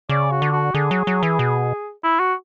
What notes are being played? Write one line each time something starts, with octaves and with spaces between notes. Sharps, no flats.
C#3 D5
F#4
D3
F#4
D3 G#4
F#3
F#3
E3
B2
E4
F#4